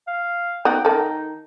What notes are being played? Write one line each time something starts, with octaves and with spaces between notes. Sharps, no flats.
F5
B3 D#4 F#4 G5
D#3 D#4 A4